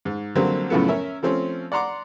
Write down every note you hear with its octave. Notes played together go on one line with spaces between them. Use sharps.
G#2
D3 F#3 G3 A#3 C4
F#2 A2 C#3 F3 A3 B3
C#4 A#4 E5
F3 A3 C4 C#4
D5 F#5 A#5 C6 D6